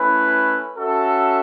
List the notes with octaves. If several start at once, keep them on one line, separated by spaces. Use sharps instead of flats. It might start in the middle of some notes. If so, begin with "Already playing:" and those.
Already playing: A3 C#4 E4 B4
C#4 F#4 A4 E5